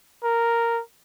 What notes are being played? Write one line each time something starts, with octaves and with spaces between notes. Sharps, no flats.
A#4